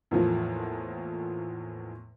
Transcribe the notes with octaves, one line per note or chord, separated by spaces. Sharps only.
E2 A2 F3 A#3